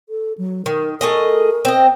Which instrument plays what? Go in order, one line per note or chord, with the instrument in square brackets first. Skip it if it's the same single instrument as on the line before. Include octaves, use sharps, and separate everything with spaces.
[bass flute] A4
F#3
[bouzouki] D#3 [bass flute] A#4
[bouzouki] A3 G#4 D#5 [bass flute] A#4
[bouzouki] C4 D#5